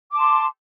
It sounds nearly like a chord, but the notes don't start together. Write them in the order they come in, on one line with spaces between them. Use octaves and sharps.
D6 A5 C6